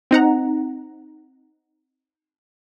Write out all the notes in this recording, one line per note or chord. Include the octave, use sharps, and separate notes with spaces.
C4 D#4 F#5 A#5